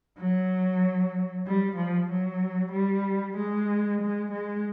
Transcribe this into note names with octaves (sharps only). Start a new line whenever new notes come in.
F#3
G3
F3
F#3
G3
G#3
G#3
G#3